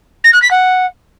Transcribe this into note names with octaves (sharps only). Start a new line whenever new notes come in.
A#6
F#6
B6
F#5